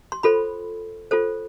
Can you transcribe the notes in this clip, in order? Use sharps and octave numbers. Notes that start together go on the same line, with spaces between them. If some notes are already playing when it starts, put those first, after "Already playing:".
C6
F4 A4 C5 B5
F4 A4 C5